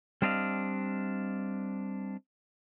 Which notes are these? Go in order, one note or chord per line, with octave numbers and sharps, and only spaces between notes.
G3 C4 D4 D#5 F5